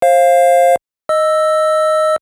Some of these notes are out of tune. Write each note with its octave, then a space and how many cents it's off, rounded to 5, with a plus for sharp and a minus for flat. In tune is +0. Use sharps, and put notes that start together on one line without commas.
C5 +30 F5 -5
D#5 +0 E6 +0